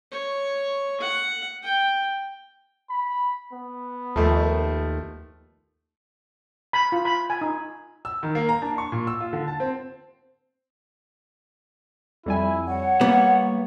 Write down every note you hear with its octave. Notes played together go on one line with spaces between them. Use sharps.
C#5
F#5
G5
B5
B3
D#2 F3 A3
B5
F4
B5
G#5
D#4
E6
D#3
A#3
A#5
D4
C#6
A#2
E6
F4
D3
A5
C4
F2 G3 E4 G#5
C#5 F#5
G3 A#3 B3